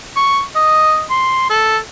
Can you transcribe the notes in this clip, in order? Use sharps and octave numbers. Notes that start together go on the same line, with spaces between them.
C#6
D#5
C6
A4